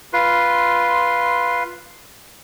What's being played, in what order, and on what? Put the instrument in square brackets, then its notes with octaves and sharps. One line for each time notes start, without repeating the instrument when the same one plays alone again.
[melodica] F4 B4 C6